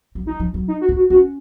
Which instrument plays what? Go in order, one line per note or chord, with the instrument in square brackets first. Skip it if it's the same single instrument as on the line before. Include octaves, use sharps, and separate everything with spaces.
[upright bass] F#3
[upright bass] F3 [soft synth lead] D#4
[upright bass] F3
F#3
[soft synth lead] D#4
F#4
[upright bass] D#4
[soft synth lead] F#4
[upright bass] C#4 [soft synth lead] F#4